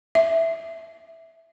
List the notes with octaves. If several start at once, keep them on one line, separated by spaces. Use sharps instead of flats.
E5